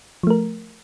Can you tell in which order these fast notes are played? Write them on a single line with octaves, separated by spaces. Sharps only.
F3 A3 A#4